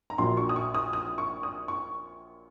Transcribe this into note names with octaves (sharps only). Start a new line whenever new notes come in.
A#5
A#1 A#2 F#3 C6
C#6
D#6
C#6
D#6
D#6
C#6
D#6
C#6